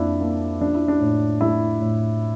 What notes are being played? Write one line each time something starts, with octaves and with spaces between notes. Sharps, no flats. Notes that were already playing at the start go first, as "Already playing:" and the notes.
Already playing: F2 F3 A#3 D4 E4
A#3
F3 D4
E4
D4
A2
A3 E4
A2